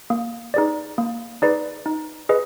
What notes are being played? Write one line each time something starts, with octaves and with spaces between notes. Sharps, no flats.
A#3
D#4 G#4 B4 D5
A#3
D#4 G#4 B4 D5
D#4
G#4 B4 D#5